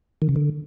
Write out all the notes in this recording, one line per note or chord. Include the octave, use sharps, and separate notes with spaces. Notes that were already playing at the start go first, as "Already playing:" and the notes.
D#3
C#3
D3